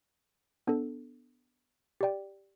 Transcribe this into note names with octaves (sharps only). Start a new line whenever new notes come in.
B3 D4 A4
G4 D5 G5